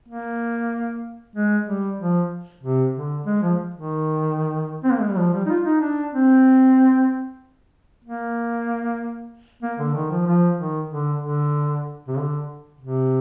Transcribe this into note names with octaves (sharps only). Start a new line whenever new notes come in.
A#3
G#3
G3
F3
C3
D3
G#3
F3
D#3
C4
A#3
G#3
G3
F3
G3
D#4
F4
D#4
D4
C4
A#3
A#3
D3
D#3
F3
F3
D#3
D3
D3
C3
D3
C3